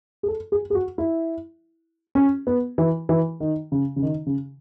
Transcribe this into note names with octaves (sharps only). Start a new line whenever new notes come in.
G#4
A4
G#4
G#4
F#4
E4
C#4
B3
E3
E3
D#3
C#3
C#3
D#3
C#3